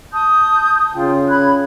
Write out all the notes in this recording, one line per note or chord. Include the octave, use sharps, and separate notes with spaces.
A5 D#6 G6
C#3 F4 G5
B5 F#6 G#6